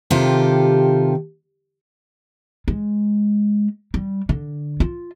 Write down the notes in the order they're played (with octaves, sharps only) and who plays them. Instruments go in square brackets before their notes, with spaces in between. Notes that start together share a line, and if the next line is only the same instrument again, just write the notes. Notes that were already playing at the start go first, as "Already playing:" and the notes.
[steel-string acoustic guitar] C3 D#3 F4 G4 A4
[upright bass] G#3
G3
D3
F4